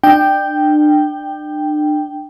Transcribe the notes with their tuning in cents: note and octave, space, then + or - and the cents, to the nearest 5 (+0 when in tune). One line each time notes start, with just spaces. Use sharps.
D4 +35 G5 +0